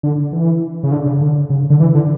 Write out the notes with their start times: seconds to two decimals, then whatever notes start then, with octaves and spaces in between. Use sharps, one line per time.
0.03 D3
0.32 E3
0.83 C#3
0.92 D3
1.06 C#3
1.21 D3
1.50 C#3
1.70 D3
1.80 E3
1.95 D3